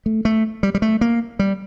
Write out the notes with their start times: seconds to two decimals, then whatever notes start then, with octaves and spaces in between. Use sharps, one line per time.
0.06 A3
0.25 A3
0.63 G3
0.75 G3
0.82 A3
1.01 A#3
1.39 G3